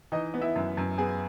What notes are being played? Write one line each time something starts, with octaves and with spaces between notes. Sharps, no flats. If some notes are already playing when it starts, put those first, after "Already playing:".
E3 D#4 D#5
B3
E4 E5
F#2
F#2
B3 G#4 G#5